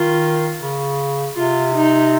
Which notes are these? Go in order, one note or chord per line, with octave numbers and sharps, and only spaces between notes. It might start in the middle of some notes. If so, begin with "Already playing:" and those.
Already playing: D#3 F4
C#3
C3 F4
D#4